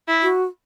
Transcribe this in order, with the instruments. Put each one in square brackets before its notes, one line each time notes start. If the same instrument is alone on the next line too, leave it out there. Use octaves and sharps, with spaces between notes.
[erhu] E4
[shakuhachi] F#4